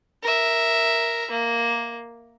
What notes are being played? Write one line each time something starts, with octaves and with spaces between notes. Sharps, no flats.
A#4 E5
A#3